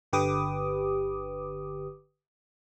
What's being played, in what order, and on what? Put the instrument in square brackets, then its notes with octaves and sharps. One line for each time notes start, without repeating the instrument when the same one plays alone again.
[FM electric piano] G1 D3 G4 B4 D6 D#6